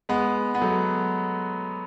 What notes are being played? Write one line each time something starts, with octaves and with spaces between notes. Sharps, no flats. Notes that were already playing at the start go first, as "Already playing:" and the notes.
G#3 B3
B3
F#3 A3